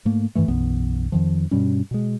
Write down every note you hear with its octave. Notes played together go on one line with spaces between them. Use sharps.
G#2 A3 A#3
G2 D#3 E3 A3
B1 F#2 E3 B3
F2 D#3 F3
G2 B2 G3 C#4
B2 G#3